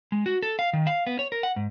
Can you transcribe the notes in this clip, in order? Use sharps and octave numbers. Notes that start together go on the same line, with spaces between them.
G#3
F#4
A4
F5
D#3
F5
B3
C#5
A#4
F#5
G#2